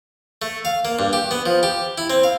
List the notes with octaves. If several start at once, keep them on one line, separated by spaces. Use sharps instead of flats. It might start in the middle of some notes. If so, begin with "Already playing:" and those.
A3
F5
A#3
G2
G4
B3
F3
G4
E4
C4
F5